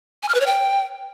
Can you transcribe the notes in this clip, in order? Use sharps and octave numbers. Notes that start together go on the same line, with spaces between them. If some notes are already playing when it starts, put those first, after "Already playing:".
G#5
F6
B4
C#5
G5